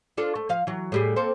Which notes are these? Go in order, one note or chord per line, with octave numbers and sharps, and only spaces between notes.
D4 F4 A4
A3
F3 F5
E3 F#3
A2 G3 G#4
A#3 C4 A4